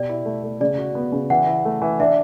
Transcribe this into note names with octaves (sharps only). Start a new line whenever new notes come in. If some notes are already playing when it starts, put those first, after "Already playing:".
Already playing: B2 G4 D5
E4
A3
A3
C#3 D5
F#4
B3
C#3
E3 F#5
E4
A3
E3
D4 E5